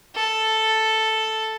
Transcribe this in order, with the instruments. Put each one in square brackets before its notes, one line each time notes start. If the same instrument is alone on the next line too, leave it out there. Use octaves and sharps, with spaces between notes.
[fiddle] A4